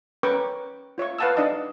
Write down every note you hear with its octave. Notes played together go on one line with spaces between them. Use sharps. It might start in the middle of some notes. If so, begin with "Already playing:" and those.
C#4 A#4 B4 G5 C#6 D6
F4 C#5 E5 C#6
B4 F5 F#5 A5 D#6 E6
D4 D#4 D5 D#5 A5 D6